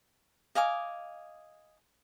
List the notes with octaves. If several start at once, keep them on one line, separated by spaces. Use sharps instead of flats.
D#5 F5 G#5 D6